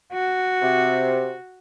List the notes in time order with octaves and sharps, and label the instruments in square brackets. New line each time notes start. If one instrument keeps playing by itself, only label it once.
[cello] F#4
[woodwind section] C3